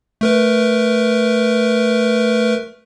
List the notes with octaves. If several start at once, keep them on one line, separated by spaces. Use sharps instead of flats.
A3 A#4 B4